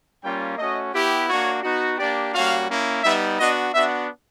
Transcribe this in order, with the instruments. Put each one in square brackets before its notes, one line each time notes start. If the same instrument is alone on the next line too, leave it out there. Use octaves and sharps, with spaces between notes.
[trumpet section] G3 A#3 C#4 F4 G5
A3 C#4 F#4 D#5
B3 E4 G4
A#3 D4 F#4 C#5
B3 D#4 F#4
A#3 D4 G4 D5
G3 A#3 C#4 F#4 F5
A#3 C#4 E4
G3 B3 D#4 E5
B3 D4 F#4 D#5
B3 D4 F#4 E5